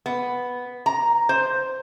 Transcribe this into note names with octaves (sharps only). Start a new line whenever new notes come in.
B3
A#5
C5